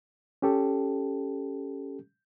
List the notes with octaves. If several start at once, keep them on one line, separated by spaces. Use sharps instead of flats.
C#4 G4 A4